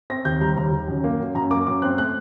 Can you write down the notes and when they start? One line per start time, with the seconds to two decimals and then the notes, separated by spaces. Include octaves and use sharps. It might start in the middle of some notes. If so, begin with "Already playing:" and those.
0.10 C4 A#6
0.25 D#2 G6
0.41 G3 A#5
0.56 D#2 A#5
0.73 D#2
0.88 F#2
1.04 A#3
1.20 F#2
1.35 F#2 A#5
1.51 A#3 D6
1.67 F#2 D6
1.82 C4 F#6
1.98 A3 F#6